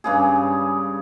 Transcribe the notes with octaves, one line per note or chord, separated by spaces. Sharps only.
G2 C#3 G#4